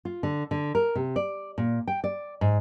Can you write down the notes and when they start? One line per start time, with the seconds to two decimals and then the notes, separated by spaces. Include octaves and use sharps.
0.05 F4
0.23 D3
0.51 D3
0.75 A#4
0.95 C3
1.16 D5
1.58 A#2
1.88 G5
2.04 D5
2.41 G#2